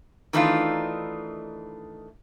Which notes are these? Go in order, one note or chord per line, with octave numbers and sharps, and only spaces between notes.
D#3 E3 A3 D4 D#4 F4